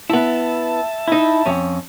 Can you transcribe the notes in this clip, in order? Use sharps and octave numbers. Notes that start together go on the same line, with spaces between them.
B3 E4 E5 A5
D#4 E4
F2 C#4